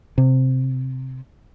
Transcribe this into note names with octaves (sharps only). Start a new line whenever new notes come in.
C3